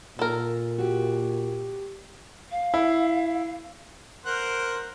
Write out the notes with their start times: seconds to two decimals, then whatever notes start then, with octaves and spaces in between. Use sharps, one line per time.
0.19 A#2 A4 A#4
0.78 F#4 G4
2.51 F5
2.74 E4
4.25 A#4 C5 F#5